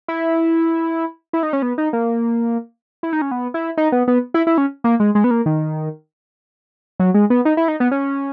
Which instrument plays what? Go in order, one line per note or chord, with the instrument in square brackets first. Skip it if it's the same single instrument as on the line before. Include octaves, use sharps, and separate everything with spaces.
[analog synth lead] E4
E4
D#4
C#4
B3
D#4
A#3
E4
D#4
C#4
B3
E4
D#4
B3
B3
E4
E4
C#4
A#3
G#3
G#3
B3
A#3
D#3
F#3
G#3
B3
D#4
E4
D#4
B3
C#4